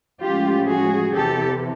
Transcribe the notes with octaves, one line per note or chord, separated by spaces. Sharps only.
A2 F3 G#3 C#4 F4 G4
F#4 G#4
E2 C3 E3 G4 A4